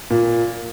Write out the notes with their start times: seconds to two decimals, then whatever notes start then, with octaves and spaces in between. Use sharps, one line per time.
0.10 A#2